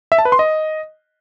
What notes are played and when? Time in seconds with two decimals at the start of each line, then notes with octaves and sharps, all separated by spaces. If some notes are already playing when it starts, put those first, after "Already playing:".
0.12 E5
0.19 A5
0.25 B4
0.32 C6
0.39 D#5